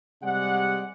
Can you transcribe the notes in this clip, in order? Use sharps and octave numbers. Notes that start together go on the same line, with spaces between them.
C3 G3 G#3 D5 F#5